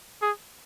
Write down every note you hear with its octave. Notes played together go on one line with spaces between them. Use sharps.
G#4